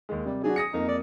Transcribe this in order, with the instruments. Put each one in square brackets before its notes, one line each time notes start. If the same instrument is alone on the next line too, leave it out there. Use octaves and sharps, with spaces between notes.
[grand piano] D#2 G#3
[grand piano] C3 [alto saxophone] G3
[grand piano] F#3 D4 F#4 [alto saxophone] G#4
[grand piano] D#6 A#6 C#7
[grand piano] F2 A#3 [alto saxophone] D#4
[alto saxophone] D5